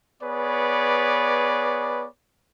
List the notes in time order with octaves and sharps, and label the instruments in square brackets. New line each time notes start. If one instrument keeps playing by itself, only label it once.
[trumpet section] B3 G#4 B4 C#5 D5